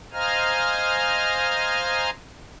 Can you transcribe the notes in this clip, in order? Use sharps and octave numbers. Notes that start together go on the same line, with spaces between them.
C5 D#5 F5 G#5 A#5 F6